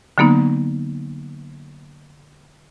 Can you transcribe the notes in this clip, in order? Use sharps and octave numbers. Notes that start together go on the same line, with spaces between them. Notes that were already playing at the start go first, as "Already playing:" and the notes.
D3 F#3 A#3 B3 D#4